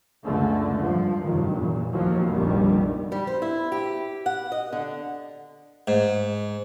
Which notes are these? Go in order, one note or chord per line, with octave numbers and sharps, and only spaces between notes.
C#2 F#2 D3 A3
G2 F3
F1 G2 D#3 F#3
E2 A#2
D#2 F3 F#3 A#3
F1 A#1 D#2 D3 D#3 G3
G3
C5
E4
G4
F#5
D#5
D3
G#2